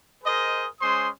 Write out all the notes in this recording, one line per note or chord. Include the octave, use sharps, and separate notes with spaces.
G#4 A#4 C5 D#5
G#3 C#4 C5 C6 D#6